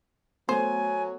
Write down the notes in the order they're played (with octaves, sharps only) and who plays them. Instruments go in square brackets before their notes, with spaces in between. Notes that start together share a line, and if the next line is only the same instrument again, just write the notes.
[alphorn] F#3 [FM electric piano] A3 B3 [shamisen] C5 [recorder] G#5